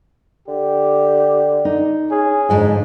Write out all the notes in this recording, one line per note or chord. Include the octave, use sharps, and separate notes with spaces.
D3 G4
D#4
C#4 G#4
F2 G#2 D3 F3